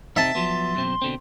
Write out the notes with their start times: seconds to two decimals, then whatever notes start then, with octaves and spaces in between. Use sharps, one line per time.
0.16 C3 C4 D#4 E5 A5
0.35 F3 F#3 B3 C6
0.75 F#2 B2 C4
1.02 B2 D3 C4